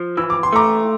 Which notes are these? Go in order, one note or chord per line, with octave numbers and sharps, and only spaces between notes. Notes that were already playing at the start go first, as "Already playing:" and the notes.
Already playing: F3
E3 E6
D6
C6
A3 A#5 D6